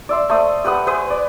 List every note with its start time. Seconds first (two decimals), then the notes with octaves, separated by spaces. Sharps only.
0.09 D5 E5 C6
0.30 A3 C5 D#6
0.64 G4 B4 F#5 D#6
0.87 B4 C5 G#5 D#6
1.10 D5